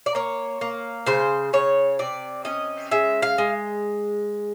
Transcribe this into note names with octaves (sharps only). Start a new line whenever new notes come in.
D5
A#3 C#5
A#3
C#3 C5
C#3 C#5
C3 D5
C#4 D#5
G#3 E5
F5
G#3